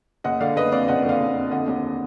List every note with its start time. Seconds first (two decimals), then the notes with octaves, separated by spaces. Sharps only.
0.24 F#1 D#5 F#5
0.40 D3 D5 F5
0.56 F#1 B4 D#5
0.72 F2 D5 F5
0.88 F#1 D#5 F#5
1.05 D3 D5 F5
1.20 F#1
1.36 F2
1.51 D3 D#5 F#5
1.68 D#2